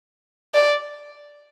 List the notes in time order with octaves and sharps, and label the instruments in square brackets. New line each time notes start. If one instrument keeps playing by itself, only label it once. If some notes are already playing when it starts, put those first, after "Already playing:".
[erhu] D5